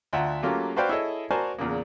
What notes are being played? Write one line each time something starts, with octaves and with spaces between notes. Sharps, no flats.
D2 F4 E5 F#5 A#5
F#3 A3 A#3 C#4 F4 G4
F#4 B4 C5 D5 F5 G5
E4 G#4 A4 C#5 D#5
F#4 A#4 C5 D5 G#5 A5
E2 A#2 C#3 A#3